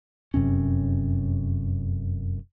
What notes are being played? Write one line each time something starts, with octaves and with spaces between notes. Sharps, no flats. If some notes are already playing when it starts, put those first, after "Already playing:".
F1 F#2 C3 C#4